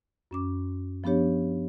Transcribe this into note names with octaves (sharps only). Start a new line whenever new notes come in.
F#2 C#4 D6
F3 B3 D4 G4 C#5